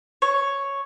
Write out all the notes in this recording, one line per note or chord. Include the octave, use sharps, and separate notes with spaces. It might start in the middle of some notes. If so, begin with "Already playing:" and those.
C#5